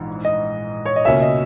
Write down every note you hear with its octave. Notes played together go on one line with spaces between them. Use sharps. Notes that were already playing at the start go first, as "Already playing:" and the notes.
Already playing: A#1 G#2 E3
D#5
C#5
D#5
C#2 B2 A#3 C#4 E5
D#5